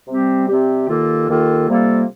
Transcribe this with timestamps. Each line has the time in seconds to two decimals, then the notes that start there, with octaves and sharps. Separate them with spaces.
0.07 C3 G3 C4 G4
0.48 C3 G3 C4 G4
0.87 D#2 D#3 A#3 F4 A4
1.28 D#2 D#3 A#3 F4 A4
1.68 C3 G3 A#3 F4 A4